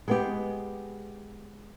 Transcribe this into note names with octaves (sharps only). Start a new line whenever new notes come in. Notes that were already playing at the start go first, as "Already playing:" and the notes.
G#3 B3 G4